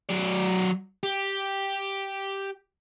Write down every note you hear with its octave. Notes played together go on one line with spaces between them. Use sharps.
F#3 D5
G4